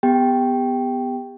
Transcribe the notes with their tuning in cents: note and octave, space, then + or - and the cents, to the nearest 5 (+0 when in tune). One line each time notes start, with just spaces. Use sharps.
B3 +10 G4 +30 G5 +0